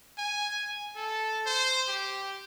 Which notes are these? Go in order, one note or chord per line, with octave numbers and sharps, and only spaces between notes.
G#5
A4
C5
G4